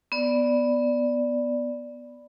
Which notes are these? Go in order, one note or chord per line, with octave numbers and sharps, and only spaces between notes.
B3 D5